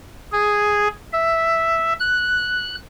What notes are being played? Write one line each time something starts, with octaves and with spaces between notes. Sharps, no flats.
G#4
E5
F#6